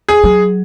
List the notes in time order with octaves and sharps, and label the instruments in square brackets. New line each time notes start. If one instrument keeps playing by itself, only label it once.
[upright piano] G#4
[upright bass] F#3